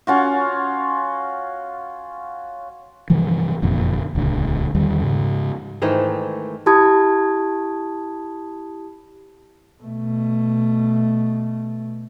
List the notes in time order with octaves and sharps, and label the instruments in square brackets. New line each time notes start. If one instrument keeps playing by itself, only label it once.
[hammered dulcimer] C#4 F4 F#4
[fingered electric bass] G2 C3 E3 F3
F#1 F2 A#2 D3
D#1 C#2 D3
E2 D#3 G3
G#2 C#3
[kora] G#2 D#3 E3 A3
[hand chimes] E4 G4 A5 B5 D#6 G#6
[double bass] B2 A3